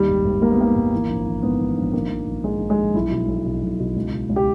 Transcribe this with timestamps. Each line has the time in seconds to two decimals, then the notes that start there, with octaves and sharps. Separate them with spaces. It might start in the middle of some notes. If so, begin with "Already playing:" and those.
Already playing: D#2 D#3 G3
0.08 G#1
0.24 G#1
0.41 G#2 A#3
0.51 B3
0.58 D#3 A#3
0.75 G#1
0.92 E3
1.10 A#1
1.27 A#1
1.43 G#2 B3
1.59 E3
1.77 A#1
1.93 D#3 A#3
2.11 A#1
2.27 A#1
2.44 G#2 G#3
2.60 D#3
2.70 G#3
2.78 A#1
2.94 B1 E4
3.11 B2
3.28 B1
3.46 B2
3.63 B1
3.80 B2
3.96 C#2
4.12 B2
4.29 C#2
4.36 G4